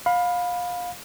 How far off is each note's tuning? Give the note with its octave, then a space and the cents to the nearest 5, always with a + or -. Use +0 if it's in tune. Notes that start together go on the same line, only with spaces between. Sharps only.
F5 +25 B5 +0